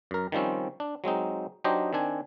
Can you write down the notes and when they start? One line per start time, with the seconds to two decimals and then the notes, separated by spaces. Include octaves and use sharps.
0.11 F#2 A#4
0.32 D#3 F3 G3 C4 C#4
0.80 D4
1.04 F#3 G#3 C4 D#4
1.64 F#3 D4 D#4 G4 C5 D#5
1.93 D#3 C4 D4 G#5